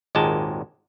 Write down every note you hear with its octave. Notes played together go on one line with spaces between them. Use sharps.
G#1 D#2 A#2 G#3 G5 A5